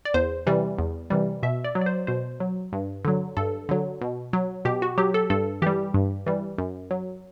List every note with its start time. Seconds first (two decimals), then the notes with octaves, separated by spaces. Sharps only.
0.05 D5
0.14 E2 C5
0.47 C3 E3 G3
0.78 E2
1.10 C3 E3 G3
1.43 B2 E5
1.65 D5
1.75 F#3
1.81 D5
1.86 C5
2.07 B2 C5
2.40 F#3
2.73 G2
3.05 D3 F#3
3.37 G2 A4
3.69 D3 F#3
4.01 B2
4.33 F#3
4.65 B2 G4
4.82 F#4
4.98 F#3 G4
5.14 A4
5.30 G2 A4
5.62 E3 G3 G4
5.94 G2
6.26 E3 G3
6.58 F#2
6.91 F#3